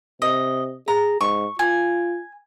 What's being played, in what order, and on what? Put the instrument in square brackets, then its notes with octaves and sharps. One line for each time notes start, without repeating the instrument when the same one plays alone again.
[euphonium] C3 [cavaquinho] D#5
[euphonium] G#4 [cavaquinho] A#5
[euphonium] G#2 [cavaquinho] C#6
[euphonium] F4 [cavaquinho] G#5